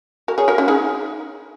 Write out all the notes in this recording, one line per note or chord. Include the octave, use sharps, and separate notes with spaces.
F#4 A#4
G#4 C#5
F#4 A#4
C#4 F#4
D#4 G#4